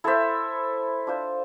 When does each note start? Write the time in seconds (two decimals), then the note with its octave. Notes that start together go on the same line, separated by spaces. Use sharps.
0.04 E4 A4 C5 E5
1.07 D4 F4 C5